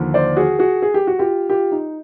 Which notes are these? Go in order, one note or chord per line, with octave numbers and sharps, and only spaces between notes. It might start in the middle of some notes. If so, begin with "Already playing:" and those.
Already playing: D#2 D3 F3
C5 D5
F#4 G#4
F#4 G#4
G#4
G4
F#4
F4 G4
F4 G4
D#4